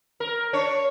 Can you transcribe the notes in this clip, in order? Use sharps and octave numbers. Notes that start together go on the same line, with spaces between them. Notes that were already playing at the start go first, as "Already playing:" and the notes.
A#4
D4 C#5